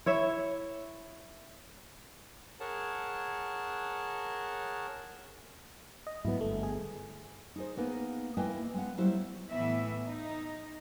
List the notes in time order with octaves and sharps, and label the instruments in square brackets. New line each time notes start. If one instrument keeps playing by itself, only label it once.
[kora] E4 C#5 E5
[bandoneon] G#4 A#4 C#5 F#5 A5
[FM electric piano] D#5
[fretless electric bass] G#2 F#3 B3 [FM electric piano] E4
[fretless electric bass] G1 [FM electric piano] A3
[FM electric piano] G#4
[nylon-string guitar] D#4 G#4 C5
A#3 B3 D#4 G#4
A#3 E4 B4 D#5 G5 G#5
G#3 B3 F#5
F#3 G3 E4 C5
[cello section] A2 E3 B3 E5
D#4